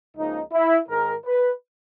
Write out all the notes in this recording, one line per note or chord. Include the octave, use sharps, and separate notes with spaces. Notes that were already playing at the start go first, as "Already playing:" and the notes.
C#2 C#3 F3 A#3 D#4
E4
G#2 D#3 G#3 A#4
B4